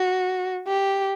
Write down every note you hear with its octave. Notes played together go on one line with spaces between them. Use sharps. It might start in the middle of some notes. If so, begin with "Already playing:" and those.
Already playing: F#4
G4